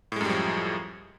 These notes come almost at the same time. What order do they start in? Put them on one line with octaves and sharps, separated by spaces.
A2 G#3 F#2 G3 F3